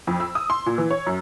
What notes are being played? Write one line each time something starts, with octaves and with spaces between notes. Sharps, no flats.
F2
E6
D#6
C6
A#2
E3
C#5
F#2